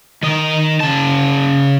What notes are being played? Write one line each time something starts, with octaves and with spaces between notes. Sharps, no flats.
D#3 D#5
C#3 A5